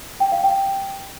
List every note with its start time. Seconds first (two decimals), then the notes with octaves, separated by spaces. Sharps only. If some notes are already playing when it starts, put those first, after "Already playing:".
0.20 G5
0.32 F5
0.44 G5